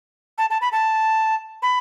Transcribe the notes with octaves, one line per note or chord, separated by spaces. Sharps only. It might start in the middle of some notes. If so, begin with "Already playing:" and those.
A5
A5
B5
A5
B5